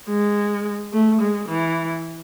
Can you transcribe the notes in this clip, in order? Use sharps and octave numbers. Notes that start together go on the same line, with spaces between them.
G#3
A3
G#3
E3